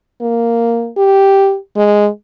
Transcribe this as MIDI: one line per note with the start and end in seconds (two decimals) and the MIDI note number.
0.21 0.90 58
0.97 1.57 67
1.76 2.08 56